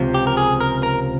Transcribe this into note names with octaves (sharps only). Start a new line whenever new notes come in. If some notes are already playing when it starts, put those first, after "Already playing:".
Already playing: C#2 C3 F3
G4
A#4
G#4
A#4
A#4